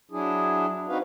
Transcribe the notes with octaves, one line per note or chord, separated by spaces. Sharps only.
F#3 D4 E4 G#4
C4 D#4 F#4 B4 F5